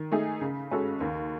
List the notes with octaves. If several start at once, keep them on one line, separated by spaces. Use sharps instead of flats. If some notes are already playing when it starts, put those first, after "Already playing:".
Already playing: D#3
A3 D#4 G#4
C#3
G#3 C#4 F#4 A4
D#2